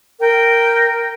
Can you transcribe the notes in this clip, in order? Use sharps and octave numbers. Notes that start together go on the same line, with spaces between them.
A#4 G5